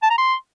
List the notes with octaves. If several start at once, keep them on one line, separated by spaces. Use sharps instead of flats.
A5
A#5
C6